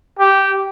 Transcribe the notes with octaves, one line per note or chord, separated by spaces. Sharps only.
G4